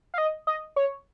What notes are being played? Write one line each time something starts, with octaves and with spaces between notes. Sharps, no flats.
F5
D#5
D#5
C#5